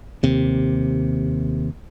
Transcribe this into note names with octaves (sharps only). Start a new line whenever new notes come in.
D#2 C3